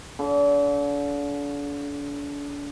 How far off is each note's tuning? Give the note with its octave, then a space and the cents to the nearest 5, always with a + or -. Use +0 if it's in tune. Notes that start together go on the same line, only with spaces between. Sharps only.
D3 -40